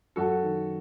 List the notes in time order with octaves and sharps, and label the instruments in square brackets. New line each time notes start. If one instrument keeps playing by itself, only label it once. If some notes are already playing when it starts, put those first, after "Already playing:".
[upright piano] F#2 F#4 A4
D#3